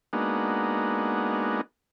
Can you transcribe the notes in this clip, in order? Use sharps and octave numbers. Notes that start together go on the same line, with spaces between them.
G#3 A#3 B3 D4 D#4 F#4